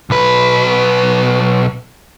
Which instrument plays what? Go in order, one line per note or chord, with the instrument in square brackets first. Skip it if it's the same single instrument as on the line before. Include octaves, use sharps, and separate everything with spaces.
[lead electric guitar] B1 B4